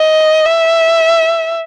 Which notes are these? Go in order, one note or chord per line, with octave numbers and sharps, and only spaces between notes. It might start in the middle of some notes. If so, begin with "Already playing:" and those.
Already playing: D#5
E5